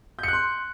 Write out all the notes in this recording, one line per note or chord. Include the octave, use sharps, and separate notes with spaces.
C6 F#6 G6 C#7